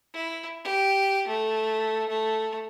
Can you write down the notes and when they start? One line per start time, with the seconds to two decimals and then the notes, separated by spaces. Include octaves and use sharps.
0.14 E4
0.65 G4
1.28 A3
2.09 A3